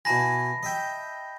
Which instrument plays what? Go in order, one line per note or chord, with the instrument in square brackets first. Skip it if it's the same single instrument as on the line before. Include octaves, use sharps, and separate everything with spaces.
[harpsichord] B2 E4 G#5 [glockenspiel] A5 B5 A#6
[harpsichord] D#5 E5 G5